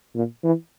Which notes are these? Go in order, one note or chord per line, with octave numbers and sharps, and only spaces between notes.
A#2
E3